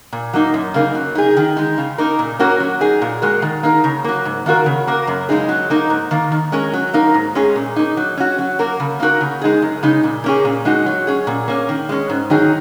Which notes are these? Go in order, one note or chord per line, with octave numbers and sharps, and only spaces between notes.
A#2
F#3 A#3 D#4
F#2
C#3 A#3 D#4
F#3
D#4 G#4
D#3
G#3 D#4
C#3
A#3 D#4 A#4
A#2
A#3 C#4 F#4 A#4
F#3
D#4 G#4
A#2
G#3 F#4 A#4
D#3
A#3 D#4 A#4
C#3
F#3 A#3
G#2
D#3 A#3 F#4 A#4
C#3
A#3 F#4 A#4
F#2
C#3 G#3 D#4 G#4
F#3
A#3 D#4 A#4
G#2
D#3 A#3
D#3
G#3 C#4 A#4
F#3
A#3 D#4 A#4
G#2
G#3 C#4 G#4
A#2
A#3 D#4
F#3
C#4 F#4
F#3
A#3 F#4 A#4
C#3
A#3 D#4 F#4 A#4
C#3
G#3 D#4 G#4
F#2
C#3 G#3 D#4
A#2
A#3 C#4 G#4
A#2
G#3 D#4 F#4
F#3
C#4 G#4
A#2
A#3 C#4
D#3
G#3 C#4
G#2
D#3 F#3 D#4 G#4